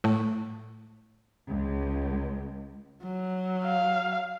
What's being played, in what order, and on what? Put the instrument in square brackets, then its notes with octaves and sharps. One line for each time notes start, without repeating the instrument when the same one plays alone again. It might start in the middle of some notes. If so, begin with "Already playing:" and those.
[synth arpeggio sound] A2 A3
[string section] C#2
[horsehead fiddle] F#3
[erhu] F5